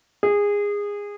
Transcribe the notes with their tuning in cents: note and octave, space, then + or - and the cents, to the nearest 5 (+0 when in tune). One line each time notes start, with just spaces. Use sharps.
G#4 -20